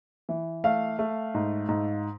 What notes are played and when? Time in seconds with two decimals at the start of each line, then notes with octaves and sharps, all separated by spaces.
0.29 E3
0.64 A3 F5
0.99 A3
1.35 G#2
1.69 G#2